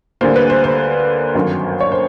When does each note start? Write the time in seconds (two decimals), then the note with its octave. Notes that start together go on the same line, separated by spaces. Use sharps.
0.21 D2 D3 G3 A#3 C5
0.36 B4
0.50 C5
0.64 C5
1.35 G1 F#2 D#3 F#3
1.80 C#5
1.92 C5